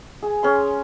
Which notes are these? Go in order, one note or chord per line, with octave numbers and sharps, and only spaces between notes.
G#4
C#4 G#4 C6